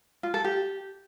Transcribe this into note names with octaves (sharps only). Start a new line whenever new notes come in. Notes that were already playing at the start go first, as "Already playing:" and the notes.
F4
A4
G4